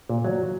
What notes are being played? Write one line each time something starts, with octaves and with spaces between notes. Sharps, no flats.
A#2
F#3